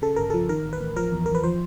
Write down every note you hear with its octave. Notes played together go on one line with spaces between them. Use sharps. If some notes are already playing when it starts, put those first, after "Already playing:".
C#3 A4
G1 A#4
F3 A4
D#3 A#4
A1
B4
A1
F3 A#4
E2
E2 A#4
B4
F3 C5